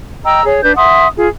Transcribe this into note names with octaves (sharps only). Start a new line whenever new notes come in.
D#5 G5 A#5 E6
G#4 C#5
D4 B4 G6
E5 F#5 C6 D#6
F4 G#4